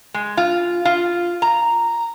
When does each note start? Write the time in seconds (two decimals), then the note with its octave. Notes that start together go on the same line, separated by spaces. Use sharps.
0.14 G#3
0.37 F4
0.85 F4
1.42 A#5